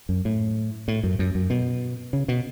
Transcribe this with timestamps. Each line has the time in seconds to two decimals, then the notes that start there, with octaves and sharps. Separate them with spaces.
0.09 F#2
0.25 A2
0.88 A2
1.04 F#2
1.19 F#2
1.35 F#2
1.50 B2
2.13 C#3
2.28 B2